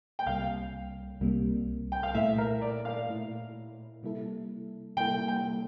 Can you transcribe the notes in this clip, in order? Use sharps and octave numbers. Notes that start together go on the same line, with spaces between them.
G5
C2 C3 G3 A#3 F5
C2 C3 G3 A#3
G5
F5
A#2 A3 E4 E5
A#4
D5
F5
A#2 A3 E4
C3 G3 A#3 E4 A4
C3 G3 A#3 E4 A4 G5
G5